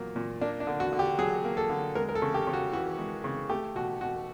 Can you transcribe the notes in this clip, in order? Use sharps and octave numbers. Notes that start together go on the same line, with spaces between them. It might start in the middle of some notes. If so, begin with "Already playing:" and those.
Already playing: A#2 F#3 A#3
A#2
A#3 D4
D4
D3
F#4
D3
G4
F#3 G#4
A#3
A4
D3
G#3 A#4
A#4
A4
C#3
G4
C#3
F#4
E3 F#4
G#3
C#3
A3 G4
B2 F#4
B2 F#4